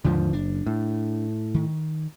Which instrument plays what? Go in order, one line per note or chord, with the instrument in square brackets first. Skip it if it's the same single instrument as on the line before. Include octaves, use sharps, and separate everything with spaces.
[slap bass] D#2 G#2 D#3 [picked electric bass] D3 F3
[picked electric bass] F#1 [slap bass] D4
[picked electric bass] A2
[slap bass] D#3